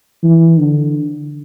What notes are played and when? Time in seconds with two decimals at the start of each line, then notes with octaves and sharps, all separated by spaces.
0.23 E3
0.59 D3